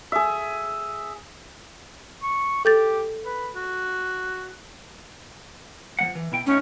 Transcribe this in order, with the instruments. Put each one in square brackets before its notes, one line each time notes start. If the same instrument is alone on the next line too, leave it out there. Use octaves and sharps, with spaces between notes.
[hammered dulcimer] G#4 E5
[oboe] C#6
[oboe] G4 [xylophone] A4 G6 A6
[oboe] B4
F#4
[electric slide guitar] F3 G3 F#5
E3
B2 E4 G5
[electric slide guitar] A2 D#4 [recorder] C#4